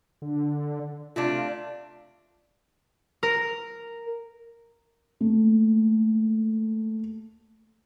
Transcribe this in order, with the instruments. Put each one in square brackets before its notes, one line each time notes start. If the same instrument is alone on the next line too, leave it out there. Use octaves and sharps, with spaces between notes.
[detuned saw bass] D3
[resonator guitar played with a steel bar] C3 A3 D4 [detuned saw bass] F4
[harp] A#4
[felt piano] A3 A#3